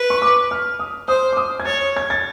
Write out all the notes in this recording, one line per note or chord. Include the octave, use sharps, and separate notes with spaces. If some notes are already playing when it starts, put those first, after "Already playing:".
Already playing: B4
C#6
D6
F6
D#6
C5 D#6
D6
D#6
G#6
C#5 A6
G#6
A6